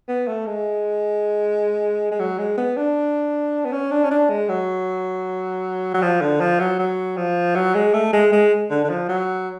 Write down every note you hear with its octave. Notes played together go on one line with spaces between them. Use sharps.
B3
A3
G#3
G#3
F#3
G#3
B3
D4
B3
C#4
D4
C#4
D4
G#3
F#3
F#3
F3
D3
F3
F#3
F#3
F3
F#3
G#3
A3
G#3
G#3
D3
D3
F3
F#3